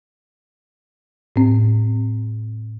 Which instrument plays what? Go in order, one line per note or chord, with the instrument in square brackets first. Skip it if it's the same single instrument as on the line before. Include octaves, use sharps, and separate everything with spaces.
[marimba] A2 C4